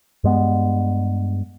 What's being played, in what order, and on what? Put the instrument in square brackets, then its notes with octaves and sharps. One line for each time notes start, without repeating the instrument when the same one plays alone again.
[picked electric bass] G2 G#3 B3